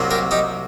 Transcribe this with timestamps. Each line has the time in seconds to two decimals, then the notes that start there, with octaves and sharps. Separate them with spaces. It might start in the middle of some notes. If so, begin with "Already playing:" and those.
Already playing: C2 C3 F#3 A#3
0.11 G4 A#4
0.31 D#4 G4